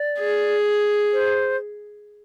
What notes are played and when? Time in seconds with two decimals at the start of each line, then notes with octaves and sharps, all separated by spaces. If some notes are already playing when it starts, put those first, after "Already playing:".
Already playing: D5
0.19 G#4
1.13 C5